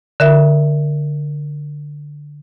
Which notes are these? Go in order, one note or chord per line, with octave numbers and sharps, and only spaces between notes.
D3 A#4 E5